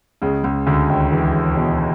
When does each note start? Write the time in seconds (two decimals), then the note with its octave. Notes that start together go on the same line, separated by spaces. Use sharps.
0.22 C#2 C#3
0.44 C#2 C#3
0.67 D2 D3
0.89 D#2 D#3
1.11 E2 E3
1.57 B2